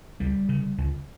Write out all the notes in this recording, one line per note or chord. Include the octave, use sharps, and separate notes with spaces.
C#2 G3
C#3
C#2